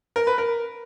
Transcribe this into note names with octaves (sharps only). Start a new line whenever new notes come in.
A#4
B4
A#4